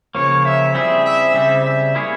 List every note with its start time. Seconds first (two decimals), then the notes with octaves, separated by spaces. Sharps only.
0.15 C#3 F3 A#3 C#5
0.45 E5
0.74 G3 C4 E4 G#4 E5
1.05 E5
1.34 C#3 G3 C4 E5
1.65 E5
1.95 A#3 E4 G#4 C#5